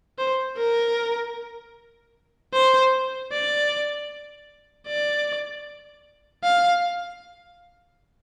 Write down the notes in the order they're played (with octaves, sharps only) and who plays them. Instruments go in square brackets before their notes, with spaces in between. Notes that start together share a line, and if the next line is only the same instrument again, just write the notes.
[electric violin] C5
A#4
C5
D5
D5
F5